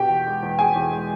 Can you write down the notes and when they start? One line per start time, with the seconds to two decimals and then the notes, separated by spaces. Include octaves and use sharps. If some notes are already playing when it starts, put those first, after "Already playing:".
Already playing: B2 G4 G5
0.10 E2
0.27 G#3
0.43 E2
0.59 B2 G#4 G#5
0.76 E2
0.91 G#3